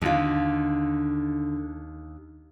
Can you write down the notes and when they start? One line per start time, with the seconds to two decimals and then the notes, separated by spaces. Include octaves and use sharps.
0.02 D#2 D3 F4